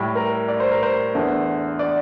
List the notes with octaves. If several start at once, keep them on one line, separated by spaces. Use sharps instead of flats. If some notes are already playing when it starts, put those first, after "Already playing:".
Already playing: A2 G3
A#4
D5
C5
A#4
C5
E2 D3 A3
D5